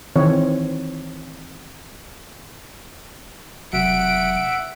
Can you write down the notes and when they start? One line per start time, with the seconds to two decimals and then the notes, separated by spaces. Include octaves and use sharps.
0.16 D#3 E3 C4 C#5
3.73 E1 C3 F#3 E5 F#5 D7